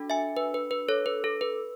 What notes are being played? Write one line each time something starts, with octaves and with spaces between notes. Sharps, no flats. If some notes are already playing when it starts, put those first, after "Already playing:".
Already playing: D4 F#4 A4
E5 G#5
B4
B4
B4
A4 C#5
B4
A4
B4